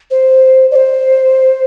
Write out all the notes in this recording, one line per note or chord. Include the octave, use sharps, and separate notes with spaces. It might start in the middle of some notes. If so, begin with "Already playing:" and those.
C5
D5
C5